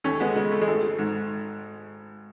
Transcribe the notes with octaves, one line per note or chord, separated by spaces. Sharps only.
D#2 A3 C#4
G#3 B3
C#3 G#3
A3
G#3
G#1 A3
G#2